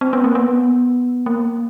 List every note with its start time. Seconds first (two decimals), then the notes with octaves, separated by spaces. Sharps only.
0.01 C4
0.13 B3
0.24 A#3
0.35 B3
1.26 A#3